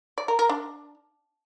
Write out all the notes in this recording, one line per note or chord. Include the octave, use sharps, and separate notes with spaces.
D5
A#4
A#4
D4